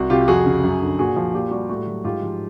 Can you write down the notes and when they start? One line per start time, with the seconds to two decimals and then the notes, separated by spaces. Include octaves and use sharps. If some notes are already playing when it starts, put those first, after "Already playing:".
Already playing: C2 F#4
0.10 C3 F4 G4
0.28 F2 F#4 G#4
0.46 C#3
0.63 F#2
0.81 D3
0.99 A#2 F#4 G#4
1.16 F3
1.34 A#2 F4 G4
1.51 G3 F#4
1.69 A2 F#4
1.87 F#3
2.04 G#2 F4 G4
2.23 F3